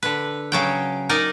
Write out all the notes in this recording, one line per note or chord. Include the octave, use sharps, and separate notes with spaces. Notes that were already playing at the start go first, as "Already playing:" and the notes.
D3 B4
C#3 F#3 G5
D#4 A#4 D5 D#5